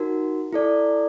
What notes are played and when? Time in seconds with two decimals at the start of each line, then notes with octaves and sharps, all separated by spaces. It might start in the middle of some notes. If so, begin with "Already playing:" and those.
Already playing: D#4 F#4 A#4
0.53 E4 A4 D5